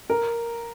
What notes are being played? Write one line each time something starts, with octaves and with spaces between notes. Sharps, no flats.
A#4